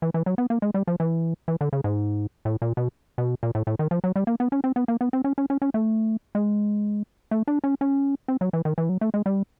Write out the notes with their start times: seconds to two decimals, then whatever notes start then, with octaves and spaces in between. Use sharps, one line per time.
0.02 E3
0.14 E3
0.26 F#3
0.38 B3
0.50 A#3
0.62 G#3
0.74 G3
0.87 F3
1.00 E3
1.48 E3
1.61 D3
1.73 C#3
1.84 G#2
2.45 A2
2.62 A#2
2.77 B2
3.18 B2
3.43 A#2
3.55 A2
3.67 A2
3.79 D#3
3.91 F3
4.04 F#3
4.16 G3
4.27 A#3
4.40 B3
4.52 C#4
4.64 C4
4.76 B3
4.88 A#3
5.01 B3
5.13 C4
5.24 C#4
5.38 C#4
5.50 C#4
5.62 C#4
5.74 A3
6.35 G#3
7.31 A3
7.48 D4
7.64 C#4
7.81 C#4
8.28 C4
8.41 F#3
8.53 E3
8.65 D#3
8.78 E3
8.89 F#3
9.01 A3
9.14 G#3
9.26 G3